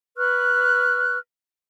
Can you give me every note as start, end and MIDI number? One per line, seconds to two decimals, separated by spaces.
0.17 1.17 71
0.17 1.17 85
0.17 1.17 89
0.17 1.17 90